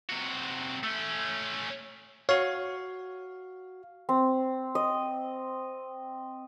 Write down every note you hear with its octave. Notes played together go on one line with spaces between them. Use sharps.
C3 F#4
A3 C#4
F#4 C#5 F5
C4
D#5